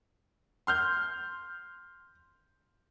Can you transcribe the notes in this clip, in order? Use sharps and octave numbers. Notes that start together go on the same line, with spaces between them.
C6 F6 G6